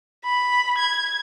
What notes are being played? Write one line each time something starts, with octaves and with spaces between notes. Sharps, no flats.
B5
G#6